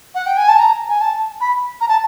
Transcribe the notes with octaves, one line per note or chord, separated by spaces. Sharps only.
F#5
G5
G#5
A5
A#5
G#5
A5
B5
A#5
A5